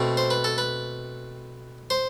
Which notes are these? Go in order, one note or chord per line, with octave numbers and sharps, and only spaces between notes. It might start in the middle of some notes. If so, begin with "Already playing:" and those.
Already playing: B2 A3 C4
C5
B4
A4
B4
C5